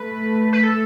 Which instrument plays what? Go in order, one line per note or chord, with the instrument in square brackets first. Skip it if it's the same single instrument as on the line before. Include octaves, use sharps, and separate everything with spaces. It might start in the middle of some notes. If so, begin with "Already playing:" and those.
Already playing: [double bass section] A3 [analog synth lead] B4
[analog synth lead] B4
A4